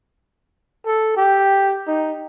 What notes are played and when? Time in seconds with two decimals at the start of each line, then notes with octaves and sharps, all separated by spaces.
0.86 A4
1.17 G4
1.87 D#4